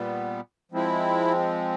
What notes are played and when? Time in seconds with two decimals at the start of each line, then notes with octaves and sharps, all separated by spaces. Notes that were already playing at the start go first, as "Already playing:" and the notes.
Already playing: A#2 G3 B3
0.72 F3 G#3 C4 E4